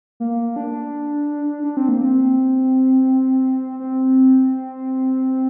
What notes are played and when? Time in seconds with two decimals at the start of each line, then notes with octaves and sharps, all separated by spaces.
0.20 A#3
0.56 D4
1.64 D4
1.77 C4
1.89 A#3
2.01 C4
3.80 C4